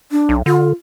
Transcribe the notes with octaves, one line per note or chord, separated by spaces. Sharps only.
D4
B1
D3 F4